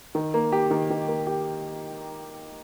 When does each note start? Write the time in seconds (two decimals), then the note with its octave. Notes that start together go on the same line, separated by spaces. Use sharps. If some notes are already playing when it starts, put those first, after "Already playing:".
0.15 D#3
0.34 A#3
0.52 G4
0.71 D#3
0.90 D#3
1.08 A#3
1.27 G4